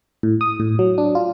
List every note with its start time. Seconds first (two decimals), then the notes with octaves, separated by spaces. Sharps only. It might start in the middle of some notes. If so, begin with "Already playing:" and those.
0.23 A2
0.41 D#6
0.60 A2
0.79 F#3
0.98 D4
1.15 F4